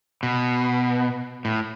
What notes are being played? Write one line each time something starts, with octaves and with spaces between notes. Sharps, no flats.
B2
A2